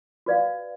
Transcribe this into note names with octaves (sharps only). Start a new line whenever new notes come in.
F#4 B4 D5 F5